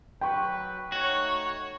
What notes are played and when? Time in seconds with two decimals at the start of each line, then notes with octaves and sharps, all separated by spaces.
0.21 F#3 B4 G5 C#6
0.92 A3 D#4 F#4 C#5